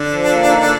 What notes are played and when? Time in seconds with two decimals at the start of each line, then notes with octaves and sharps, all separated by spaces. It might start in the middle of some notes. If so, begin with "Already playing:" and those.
Already playing: D3 D4
0.11 F3
0.31 A#3
0.50 D#4